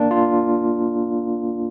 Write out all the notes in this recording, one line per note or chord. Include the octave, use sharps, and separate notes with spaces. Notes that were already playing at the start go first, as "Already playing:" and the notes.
Already playing: A#3 D4
F4